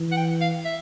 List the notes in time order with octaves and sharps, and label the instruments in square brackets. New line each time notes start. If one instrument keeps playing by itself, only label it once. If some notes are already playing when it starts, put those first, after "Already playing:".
Already playing: [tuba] E3
[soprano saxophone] F#5
G5
F5
E5